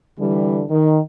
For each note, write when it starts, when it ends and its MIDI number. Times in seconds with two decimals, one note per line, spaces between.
0.19 0.64 50
0.19 0.64 52
0.19 0.64 55
0.70 0.99 51